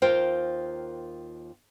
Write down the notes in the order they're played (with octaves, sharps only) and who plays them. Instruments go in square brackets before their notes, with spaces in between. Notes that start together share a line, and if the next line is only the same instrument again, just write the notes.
[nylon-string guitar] D#2 F4 A#4 C5 G5